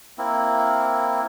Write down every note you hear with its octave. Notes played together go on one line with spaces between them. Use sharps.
A#3 C4 E4